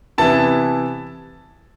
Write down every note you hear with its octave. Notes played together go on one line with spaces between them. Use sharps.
C3 E3 B3 E4 A5